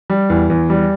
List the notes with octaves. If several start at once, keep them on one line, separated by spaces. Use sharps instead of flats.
G3
E2
E2
G3